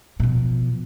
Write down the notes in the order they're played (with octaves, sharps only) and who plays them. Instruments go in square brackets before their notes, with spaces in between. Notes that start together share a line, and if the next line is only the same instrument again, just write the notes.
[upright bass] B2 F3